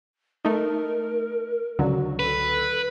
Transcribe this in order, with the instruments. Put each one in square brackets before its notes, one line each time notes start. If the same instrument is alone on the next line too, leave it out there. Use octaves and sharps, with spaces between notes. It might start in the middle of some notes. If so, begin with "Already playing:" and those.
[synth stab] A3 D#4 [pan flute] A#4
[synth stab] C#2 D3 F#3 [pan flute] F#4
[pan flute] A4 [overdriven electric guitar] B4